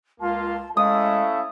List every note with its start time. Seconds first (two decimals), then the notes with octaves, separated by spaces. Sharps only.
0.20 C#2 A#3 F4 A5
0.77 G#3 A3 C#4 E4 F5 D#6